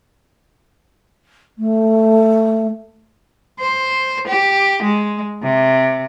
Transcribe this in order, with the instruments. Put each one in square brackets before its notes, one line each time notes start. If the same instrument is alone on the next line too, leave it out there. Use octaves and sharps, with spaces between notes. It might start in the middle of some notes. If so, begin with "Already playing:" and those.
[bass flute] A3
[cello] C5
G4
G#3
C3